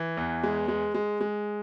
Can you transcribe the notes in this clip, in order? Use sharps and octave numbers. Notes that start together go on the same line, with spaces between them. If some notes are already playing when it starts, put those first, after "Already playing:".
Already playing: E3
E2
G#3
G#3
G#3
G#3